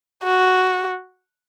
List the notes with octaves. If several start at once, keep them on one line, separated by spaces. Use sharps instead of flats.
F#4